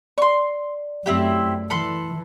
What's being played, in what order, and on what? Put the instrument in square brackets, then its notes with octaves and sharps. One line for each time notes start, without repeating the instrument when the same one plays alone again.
[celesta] D5 [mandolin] C6 C#6
[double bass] F#2 A3 [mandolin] C4 E4 G4
[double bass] E3 [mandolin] A4 B5 C6